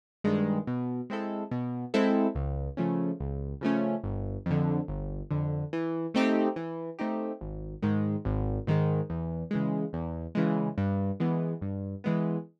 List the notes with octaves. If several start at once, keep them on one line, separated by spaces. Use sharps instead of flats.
G2 D#3 G#3
B2
G#3 C4 E4 A4
B2
G#3 C4 E4 A4
C#2
C#3 F3 A3 C#4
C#2
C#3 F3 A3 C#4
G1
F2 D3
G1
F2 D3
E3
A3 C4 D#4 G4
E3
A3 C4 D#4 G4
G#1
G#2 D#3 G#3
G#1
G#2 D#3 G#3
E2
C#3 E3 G#3
E2
C#3 E3 G#3
G2
E3 G#3 B3
G2
E3 G#3 B3